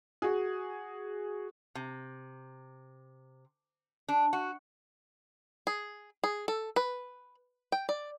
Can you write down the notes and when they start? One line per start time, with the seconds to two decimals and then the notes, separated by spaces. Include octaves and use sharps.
0.22 F#4 G#4
1.75 C3
4.08 D4
4.33 F#4
5.67 G#4
6.24 G#4
6.48 A4
6.76 B4
7.72 G5
7.89 D5